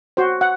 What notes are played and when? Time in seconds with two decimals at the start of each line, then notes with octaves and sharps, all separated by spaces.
0.17 F#4 C5
0.41 F#5